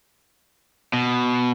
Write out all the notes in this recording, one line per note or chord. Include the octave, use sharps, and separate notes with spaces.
B2